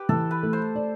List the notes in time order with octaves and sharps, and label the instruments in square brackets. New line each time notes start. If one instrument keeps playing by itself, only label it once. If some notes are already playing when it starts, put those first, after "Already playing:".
Already playing: [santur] G4 B4
[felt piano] E3 [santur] A4
[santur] B4
[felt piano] A3
[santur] C5
[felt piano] D5